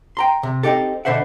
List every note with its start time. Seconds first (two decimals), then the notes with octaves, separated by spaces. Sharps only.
0.17 G5 A#5 C6
0.43 C3
0.63 C4 C#4 D#4 G4 A4
1.05 B2 D3 C5 E5 F#5